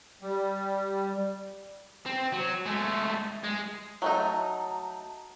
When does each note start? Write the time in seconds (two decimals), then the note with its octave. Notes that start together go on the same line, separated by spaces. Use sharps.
0.22 G3
2.06 C4
2.33 F#3
2.66 G#3 A3
3.44 G#3
4.02 F#3 A3 D#4